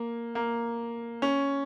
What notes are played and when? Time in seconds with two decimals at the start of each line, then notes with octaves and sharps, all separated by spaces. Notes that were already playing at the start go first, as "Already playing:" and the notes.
Already playing: A#3
0.35 A#3
1.22 C#4